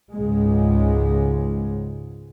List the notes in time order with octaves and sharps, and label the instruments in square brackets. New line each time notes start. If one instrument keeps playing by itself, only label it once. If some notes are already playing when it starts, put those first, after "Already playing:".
[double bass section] C#2 G#2 G#3